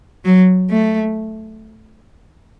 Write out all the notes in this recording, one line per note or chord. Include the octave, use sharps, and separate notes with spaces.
F#3
A3